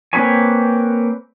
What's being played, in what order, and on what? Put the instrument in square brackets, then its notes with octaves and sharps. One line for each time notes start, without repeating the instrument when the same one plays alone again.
[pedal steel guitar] A#3 C4 B4 C#5 G#5